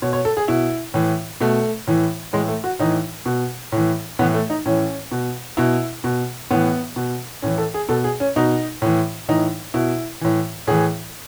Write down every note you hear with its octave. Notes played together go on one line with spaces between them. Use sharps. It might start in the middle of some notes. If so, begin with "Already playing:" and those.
B2 C#5
C#5
A4
G#4
B2 E4
A2 E3
B2 A3
A2 E3
A2 E3 G#3
A3
F#4
A2 E3 D#4
B2
A2 E3
A2 E3 B3
A3
D#4
A2 E3 C#4
B2
B2 E4
B2
A2 E3 B3
B2
A2 E3 C#4
A4
G#4
B2 A4
G#4
C#4
B2 D#4
A2 E3
A2 E3 D#4
B2 E4
A2 E3
A2 E3 G#4